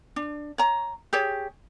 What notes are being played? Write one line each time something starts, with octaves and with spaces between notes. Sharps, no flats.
D4
C#5 A#5
G4 G#4 C#5